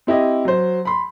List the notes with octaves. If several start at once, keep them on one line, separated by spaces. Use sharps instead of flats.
C4 E4 G4 D#5
F#3 C5
B5 C6